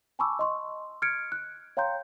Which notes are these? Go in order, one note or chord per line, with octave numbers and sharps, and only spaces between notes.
G#5 A5 B5 C#6 D6 E6
D#5 C6 C#6
F6 G#6 C#7 D7
F#6
C#5 F5 G5 A#5 C6 G6